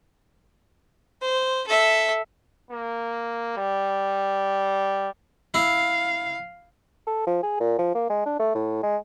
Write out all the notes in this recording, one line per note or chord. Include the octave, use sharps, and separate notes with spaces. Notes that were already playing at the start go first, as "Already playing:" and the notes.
C5
A4 E5
A#3
G3
E4 F5
A4
F3
G#4
A#2
F3
A#3
G#3
D4
A3
A2
G#3